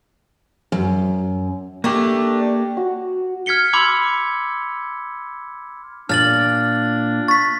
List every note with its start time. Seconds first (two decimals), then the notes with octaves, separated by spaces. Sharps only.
0.72 F#2
1.84 A3 A#3 D4 G4
2.77 F#4
3.46 F6 G#6 B6 C#7 G7
3.73 B5 C6 D6 E6 F6 G#6
6.09 A#2 D4 F6 A6 F#7
7.28 C#6 A6 B6